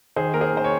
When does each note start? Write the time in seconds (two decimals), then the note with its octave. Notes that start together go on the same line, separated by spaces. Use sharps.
0.16 D#3 G#4 C5
0.34 A#3 A#4
0.41 G#4 C5
0.53 D#3 C5
0.64 C#5